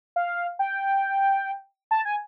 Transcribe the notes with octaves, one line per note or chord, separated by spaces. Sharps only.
F5
G5
A5
G#5